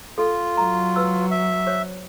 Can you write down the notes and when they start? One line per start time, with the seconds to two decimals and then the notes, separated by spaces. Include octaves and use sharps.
0.18 F4 A4
0.57 F#3 A#5
0.96 B4 E6
1.31 E5
1.67 C5 C#5